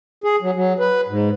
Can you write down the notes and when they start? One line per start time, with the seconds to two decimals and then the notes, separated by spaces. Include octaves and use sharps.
0.24 G#4
0.42 F#3
0.55 F#3
0.79 B4
1.08 G#2